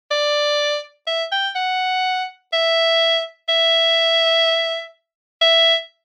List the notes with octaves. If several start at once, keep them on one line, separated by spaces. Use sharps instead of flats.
D5
E5
G5
F#5
E5
E5
E5